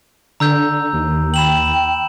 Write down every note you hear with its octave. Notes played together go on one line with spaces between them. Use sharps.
D3 A#5 E6 G6
D#2
G5 B5 E7 F#7